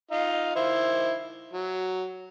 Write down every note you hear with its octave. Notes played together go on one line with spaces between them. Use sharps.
D#4 F4 F5
D#3 E4 C5
F#3